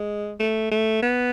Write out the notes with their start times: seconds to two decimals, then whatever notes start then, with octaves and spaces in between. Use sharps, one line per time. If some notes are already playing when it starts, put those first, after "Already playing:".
Already playing: G#3
0.40 A3
0.71 A3
1.03 B3